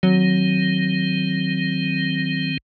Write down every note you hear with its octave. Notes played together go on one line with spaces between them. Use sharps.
D#3 F#3 C4